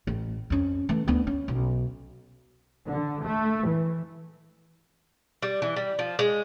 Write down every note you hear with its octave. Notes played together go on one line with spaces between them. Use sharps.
A1
F2 C#4
E3 A3
D2 B3
C#4
B1
D3
A3
E3
G3
E3
G3
F3
G#3